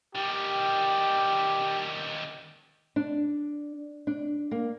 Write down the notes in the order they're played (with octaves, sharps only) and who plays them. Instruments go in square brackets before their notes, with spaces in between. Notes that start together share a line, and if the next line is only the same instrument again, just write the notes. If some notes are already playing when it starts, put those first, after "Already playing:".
[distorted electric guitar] D#3 G3 [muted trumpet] G4
[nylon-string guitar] D4
D4
A#3